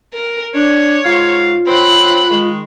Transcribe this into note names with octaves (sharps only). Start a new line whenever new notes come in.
A#4
D4 C#5
G#2 F4 F#4 F5
F#3 C4 C5 B5 F#6
D#3 G#3